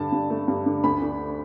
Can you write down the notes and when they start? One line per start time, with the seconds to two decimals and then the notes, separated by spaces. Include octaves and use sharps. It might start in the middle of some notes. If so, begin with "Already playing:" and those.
Already playing: G2 D3 A5
0.12 G2
0.30 A3
0.48 G2
0.66 D3
0.83 D2 B5
1.01 D3